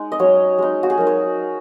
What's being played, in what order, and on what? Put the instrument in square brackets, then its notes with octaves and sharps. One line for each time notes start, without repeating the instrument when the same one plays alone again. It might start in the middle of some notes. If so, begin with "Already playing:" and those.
Already playing: [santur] G#3 D#4
D#5
F#3 C#4 C#5
G#3 D#4
F#4
G#4
F#3 D#4 A#4
C#5